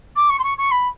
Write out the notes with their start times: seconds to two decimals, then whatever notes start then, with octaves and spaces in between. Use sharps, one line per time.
0.16 D6
0.30 C#6
0.39 C6
0.44 C#6
0.58 C#6
0.71 B5